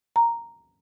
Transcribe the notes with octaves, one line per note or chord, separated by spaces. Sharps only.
A#5